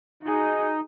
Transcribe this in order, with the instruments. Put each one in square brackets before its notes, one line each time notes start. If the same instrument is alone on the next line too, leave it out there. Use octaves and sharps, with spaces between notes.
[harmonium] D#4 [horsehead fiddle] F#4 G#4